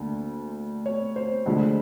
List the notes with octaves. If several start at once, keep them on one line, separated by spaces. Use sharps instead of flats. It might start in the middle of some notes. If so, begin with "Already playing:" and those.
Already playing: D2 D3 A#3
C#5
C5
D2 D3 F3 G#3